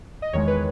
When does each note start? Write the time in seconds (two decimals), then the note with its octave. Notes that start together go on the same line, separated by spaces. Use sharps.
0.22 D#5
0.33 E2 D#3 G#3 C#5
0.48 B4